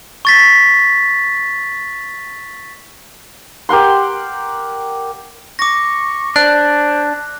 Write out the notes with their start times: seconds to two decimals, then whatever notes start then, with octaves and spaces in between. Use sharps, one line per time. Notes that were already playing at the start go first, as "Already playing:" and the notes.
0.25 C#6 A6 B6
3.69 G4 A#4 F#5 C6
5.59 C#6 D6 A#6
6.36 D4 C5 F#6